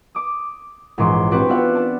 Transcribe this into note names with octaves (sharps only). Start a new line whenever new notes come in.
D6 D#6
A#1 G#2 E3 C#4 C6 D6
C4 D4 F#4 G4 B4
B3 F4 D5 E5 F#5
D4 A5 E7